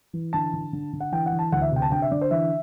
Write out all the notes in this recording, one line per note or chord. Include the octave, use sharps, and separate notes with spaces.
E3
D3 A5
D3
D3
D3
F#5
E3 G5
F#5
E3
A5
D2 F#5
E5
C3 G5
A5
D3 G5
E5
D3 D5
C5
E3 E5